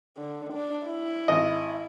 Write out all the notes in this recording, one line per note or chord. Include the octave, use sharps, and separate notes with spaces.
D3
D4
E4
G#1 D#5